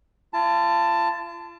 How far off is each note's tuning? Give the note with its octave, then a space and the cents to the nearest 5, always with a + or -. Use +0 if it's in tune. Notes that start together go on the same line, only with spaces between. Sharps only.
F4 -40 A5 +10